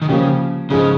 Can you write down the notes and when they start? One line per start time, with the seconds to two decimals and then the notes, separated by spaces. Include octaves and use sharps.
0.02 D#3
0.09 C#3 F3 A#3 C#4 G4
0.70 G#2 C#3 F3 G#3 C#4